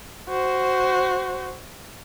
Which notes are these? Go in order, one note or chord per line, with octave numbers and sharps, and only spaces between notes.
F#4 C5